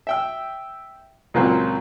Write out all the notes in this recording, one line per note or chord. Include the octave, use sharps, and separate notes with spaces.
E5 G5 E6
C#2 A#2 F#3 C4